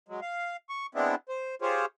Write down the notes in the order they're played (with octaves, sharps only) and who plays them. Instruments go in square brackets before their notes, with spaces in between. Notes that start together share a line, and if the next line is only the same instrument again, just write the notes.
[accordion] F#3 G#3
F5
C#6
G#3 B3 C4 D4 E4
C5
F4 G4 G#4 C5 C#5